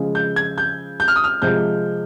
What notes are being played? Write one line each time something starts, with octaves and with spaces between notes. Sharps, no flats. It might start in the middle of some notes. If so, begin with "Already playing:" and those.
Already playing: C#3 F3 G#3
G6
G#6
G6
G6
F6
D#6
F6
C3 F3 G#3 G6